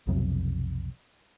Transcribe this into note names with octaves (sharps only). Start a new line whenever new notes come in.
B1 F2 C3 F#3